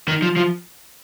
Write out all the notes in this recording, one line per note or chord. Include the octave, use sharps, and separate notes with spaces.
D#3
F3
F3